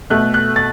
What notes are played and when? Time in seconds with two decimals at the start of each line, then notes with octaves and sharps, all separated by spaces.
0.10 B2 A3 F#6
0.34 F#6
0.56 A6